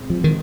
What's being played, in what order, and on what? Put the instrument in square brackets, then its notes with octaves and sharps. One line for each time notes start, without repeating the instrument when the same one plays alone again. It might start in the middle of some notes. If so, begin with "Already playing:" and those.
Already playing: [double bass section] A#2 G#3 C4
[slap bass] F3
D#3